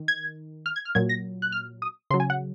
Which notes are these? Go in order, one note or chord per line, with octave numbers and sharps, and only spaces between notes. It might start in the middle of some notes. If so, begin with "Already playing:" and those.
Already playing: D#3
G#6
F6
G#6
F6
A#2 F#3 G#6
A#6
F#6
F6
D#6
C#3 F#3 C6
G#5
F#5